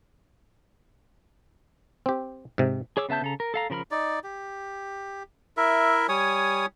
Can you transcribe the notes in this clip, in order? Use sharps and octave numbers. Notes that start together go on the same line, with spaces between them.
C4 G4
G#2 C3
G#4 C#5 D6 E6
C#3 B3 E5 A5 G6
C#3 A4 A#5
A#4
A4 F5 A#5
C#3 F3 A#4 B5 F6
D#4 D5
G4
E4 A#4 E5
G3 C#5 G#5 D#6